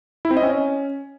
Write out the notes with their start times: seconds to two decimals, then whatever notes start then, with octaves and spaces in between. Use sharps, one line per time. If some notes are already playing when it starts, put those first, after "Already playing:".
0.25 E4
0.31 C4
0.37 D#5
0.43 C#4